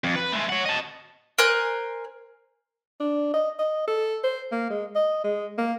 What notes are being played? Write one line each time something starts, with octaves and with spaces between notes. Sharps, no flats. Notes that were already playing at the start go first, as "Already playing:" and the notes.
F2
B4
G#3 A3
C#5 F#5
D#5 A5
A#4 C5 G#5 F#6
D4
D#5
D#5
A4
C5
A#3
G#3
D#5
G#3
A#3